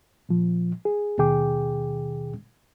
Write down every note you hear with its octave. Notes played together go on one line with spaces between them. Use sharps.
A#2 F3
G#4
D#2 B2 D#3 G#4 G5 D6